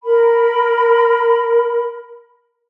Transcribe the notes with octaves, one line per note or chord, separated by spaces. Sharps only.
A#4 B5